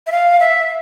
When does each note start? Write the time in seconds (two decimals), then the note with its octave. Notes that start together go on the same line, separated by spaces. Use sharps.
0.07 E5
0.12 F5
0.40 E5